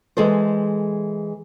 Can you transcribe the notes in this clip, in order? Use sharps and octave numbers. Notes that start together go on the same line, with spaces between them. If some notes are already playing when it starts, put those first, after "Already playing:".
E3 G#3 G#4 A4 C5